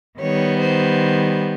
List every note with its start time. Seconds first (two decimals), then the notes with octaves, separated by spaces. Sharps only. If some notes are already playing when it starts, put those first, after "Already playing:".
0.19 D#3 G3 B3 C#5
0.61 C5